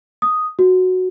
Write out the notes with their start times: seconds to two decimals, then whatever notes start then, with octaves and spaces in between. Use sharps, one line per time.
0.22 D#6
0.59 F#4